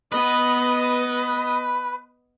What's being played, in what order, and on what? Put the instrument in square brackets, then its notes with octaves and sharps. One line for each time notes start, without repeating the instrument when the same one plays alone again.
[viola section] B3 D#5 [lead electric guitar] B4